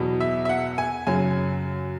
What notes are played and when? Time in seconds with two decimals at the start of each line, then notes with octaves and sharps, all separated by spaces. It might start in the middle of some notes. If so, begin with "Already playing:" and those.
Already playing: E2 B2 F#3
0.21 E5
0.45 E5
0.49 F#5
0.78 G#5
1.07 F#2 C#3 F#3 G#5